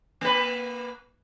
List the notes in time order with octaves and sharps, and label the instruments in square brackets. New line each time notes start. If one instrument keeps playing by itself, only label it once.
[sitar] A#3 B4